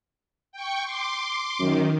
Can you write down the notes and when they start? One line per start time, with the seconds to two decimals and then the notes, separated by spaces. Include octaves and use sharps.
0.52 G5 C#6
0.84 C6 D6
1.60 F#2 D#3